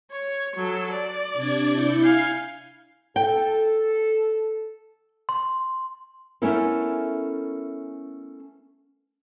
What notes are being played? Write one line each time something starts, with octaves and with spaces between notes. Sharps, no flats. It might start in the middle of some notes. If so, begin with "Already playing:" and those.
C#5
F#3 A4
D5
C3 D4 G#6
E4 G6 C#7
F5 G#5
A4 G5
C6
A3 B3 C#4 E4 A4 A#4